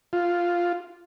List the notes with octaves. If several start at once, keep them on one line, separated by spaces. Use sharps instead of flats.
F4